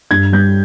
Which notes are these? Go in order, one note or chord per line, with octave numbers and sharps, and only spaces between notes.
G2 G#6
G3 G6